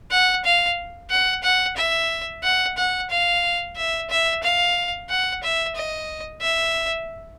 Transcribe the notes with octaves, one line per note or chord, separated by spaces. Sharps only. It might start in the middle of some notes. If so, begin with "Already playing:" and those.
F#5
F5
F#5
F#5
E5
F#5
F#5
F5
E5
E5
F5
F#5
E5
D#5
E5